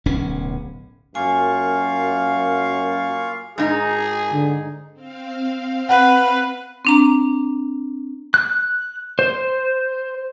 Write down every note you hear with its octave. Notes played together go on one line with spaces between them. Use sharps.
D1 B1 C#4
F#2 A#3 F4 F5 G#5 C#6
G#2 D#4 G#4
D3
C4 F5
B4 F#5
C4 D4 A#5
F#6
C5